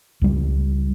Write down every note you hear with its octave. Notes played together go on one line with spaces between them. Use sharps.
C#2 G3